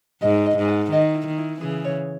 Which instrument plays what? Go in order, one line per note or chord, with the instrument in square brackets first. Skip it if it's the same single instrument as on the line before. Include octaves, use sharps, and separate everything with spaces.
[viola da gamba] G#2 [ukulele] D#5
[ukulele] D#5
[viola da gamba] G#2
[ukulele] F#5
[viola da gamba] D#3 [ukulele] D#5
[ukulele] E4
[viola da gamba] D#3
[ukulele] E4
[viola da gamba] C#3 E3 [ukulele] G#4
[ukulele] C#5